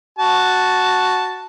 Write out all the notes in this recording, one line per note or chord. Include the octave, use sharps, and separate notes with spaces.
F#4 A5